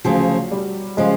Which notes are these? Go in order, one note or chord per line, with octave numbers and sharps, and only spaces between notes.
D2 C#3 F3 F#3
G3
C#3 F3 G#3